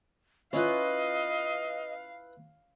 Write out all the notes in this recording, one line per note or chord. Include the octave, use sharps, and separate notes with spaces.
C#4 E4 F4 B4 D#5 F5